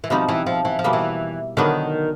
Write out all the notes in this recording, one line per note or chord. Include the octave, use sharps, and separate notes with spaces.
E3
B2 F3 G3 C4 D#4
E3
F3
E3
F3
B2 G3 A#3
E3
D3 D#3 F#3 B3 D4